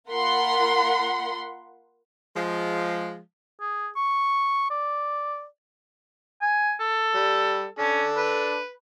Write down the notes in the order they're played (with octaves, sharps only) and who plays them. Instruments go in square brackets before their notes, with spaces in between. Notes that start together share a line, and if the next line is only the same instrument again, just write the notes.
[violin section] A#3 F4 A#4 F#5 B5 C6
[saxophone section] F3 G#3
[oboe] G#4
C#6
D5
G#5
A4
[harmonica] G3
[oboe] C#4 [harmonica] D4 A4
[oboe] B4